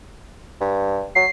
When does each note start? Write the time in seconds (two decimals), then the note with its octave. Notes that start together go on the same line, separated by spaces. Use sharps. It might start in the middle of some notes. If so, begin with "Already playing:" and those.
0.61 G2
1.15 F#3 C7